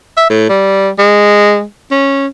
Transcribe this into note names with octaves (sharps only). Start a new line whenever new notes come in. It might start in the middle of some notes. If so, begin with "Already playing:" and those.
E5
A2
G3
G#3
C#4